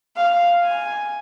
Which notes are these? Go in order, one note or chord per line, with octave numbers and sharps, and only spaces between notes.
F5
G#5